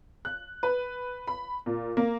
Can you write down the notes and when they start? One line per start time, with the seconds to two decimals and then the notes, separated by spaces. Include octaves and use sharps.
0.25 F#6
0.63 B4
1.28 B5
1.66 A#2
1.97 A#3